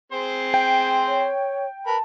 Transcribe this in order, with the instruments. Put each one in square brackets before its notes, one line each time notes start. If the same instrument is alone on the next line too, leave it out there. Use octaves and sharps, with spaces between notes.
[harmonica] C4 G#4 C5
[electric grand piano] G5
[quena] C#5
[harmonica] A#4 B4 B5 [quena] A5